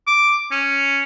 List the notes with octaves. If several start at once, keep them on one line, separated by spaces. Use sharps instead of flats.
D6
C#4